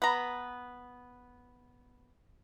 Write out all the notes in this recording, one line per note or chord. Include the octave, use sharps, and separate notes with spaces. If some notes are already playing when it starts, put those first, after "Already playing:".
B3 A#5